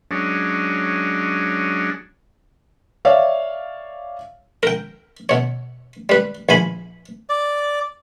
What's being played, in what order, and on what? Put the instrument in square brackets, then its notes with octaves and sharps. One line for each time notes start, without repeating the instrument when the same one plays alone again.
[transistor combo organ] F#3 G#3 C#4 D4
[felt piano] C#5 D5 E5 F5
[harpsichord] A#4 G5
B2 C#5
G3 B4
A#1 E3 G#5 B5
[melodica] D5